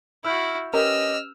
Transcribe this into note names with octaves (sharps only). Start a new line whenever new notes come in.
E4 F#4 E6 F6 G6
C#4 G4 A#4 B4 D#5 E6 F6